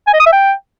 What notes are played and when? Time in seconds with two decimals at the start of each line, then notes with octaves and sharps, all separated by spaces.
0.07 G#5
0.14 D#5
0.20 D#6
0.26 E5
0.33 G5